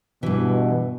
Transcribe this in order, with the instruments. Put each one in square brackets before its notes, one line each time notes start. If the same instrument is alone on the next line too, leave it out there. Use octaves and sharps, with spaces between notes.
[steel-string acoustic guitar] G2 E3 [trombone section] B2